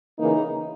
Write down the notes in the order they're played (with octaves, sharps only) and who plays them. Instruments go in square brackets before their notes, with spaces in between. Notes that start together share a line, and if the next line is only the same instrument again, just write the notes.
[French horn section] C#3 E3 A#3 D#4